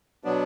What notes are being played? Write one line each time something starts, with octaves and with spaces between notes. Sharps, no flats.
B2 F#3 B3 D4